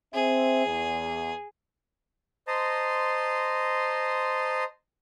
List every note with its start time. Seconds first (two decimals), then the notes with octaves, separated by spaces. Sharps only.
0.14 C4 G#4 C5 E5
0.66 E2
2.47 C5 D#5 A5 A#5 C6